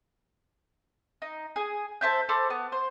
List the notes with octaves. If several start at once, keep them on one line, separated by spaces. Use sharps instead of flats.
D#4
G#4
A4 C5 E5 G6
A4 C5 B5 D6
B3
C5